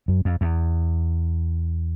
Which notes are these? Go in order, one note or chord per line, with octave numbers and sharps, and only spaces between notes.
F#2
F2
E2